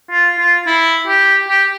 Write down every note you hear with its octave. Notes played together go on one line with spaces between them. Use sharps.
F4
F4
E4
G4
G4